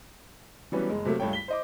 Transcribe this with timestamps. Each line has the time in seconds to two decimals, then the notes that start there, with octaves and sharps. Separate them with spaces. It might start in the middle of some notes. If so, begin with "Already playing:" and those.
0.72 E3 F#3 G3 B3 C#4
0.89 F#1 G#3
1.05 C3 F#3 A3 A#3
1.20 C#2 G2 A3 C#5 G5
1.33 B6 G7
1.48 C5 D#5 D6